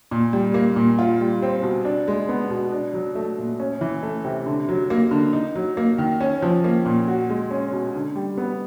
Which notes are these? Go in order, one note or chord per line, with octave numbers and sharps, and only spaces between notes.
A#2
G3
A#3
A#2
F4
G3
C4
B2
D4
G#3
B3
B2
D4
F#3
A3
A#2
C#4
E3
A3
C3
D3
F#3
A#3
D3
D#4
F#3
A#3
D#3
C#4
F3
A#3
A#2
F#4
G#3
C#4
B2
D3
G3
B3